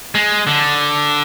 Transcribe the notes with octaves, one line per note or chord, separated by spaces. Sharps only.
G#3
D3